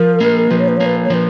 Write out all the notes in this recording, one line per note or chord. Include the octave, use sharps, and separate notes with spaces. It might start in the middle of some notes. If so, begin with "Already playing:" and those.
Already playing: F3 A#4
A#3
F3 B4
C#5
B4
A#3 C#5
B4
C#5
F3 B4